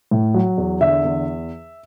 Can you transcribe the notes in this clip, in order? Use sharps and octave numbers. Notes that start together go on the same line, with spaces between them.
A2
F#3
E2
D3 E5
E2